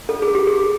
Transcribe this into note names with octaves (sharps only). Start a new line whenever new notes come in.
A4
G#4
G4
G#4